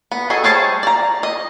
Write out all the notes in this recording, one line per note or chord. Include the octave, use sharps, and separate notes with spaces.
B3
F#4 G#4 A4 D#5
G3 G#4 C5 C#5 A5
D5 A#5
D#5